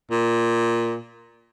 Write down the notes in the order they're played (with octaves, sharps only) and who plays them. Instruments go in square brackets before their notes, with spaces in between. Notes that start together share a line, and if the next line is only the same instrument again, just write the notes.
[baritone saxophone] A#2